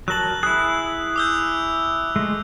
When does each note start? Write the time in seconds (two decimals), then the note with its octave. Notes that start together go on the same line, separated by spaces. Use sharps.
0.08 F#3 A#4 A5 F#6 F#7
0.43 E4 G#4 F#6
1.16 D6 E6 G6
2.16 G#3 A3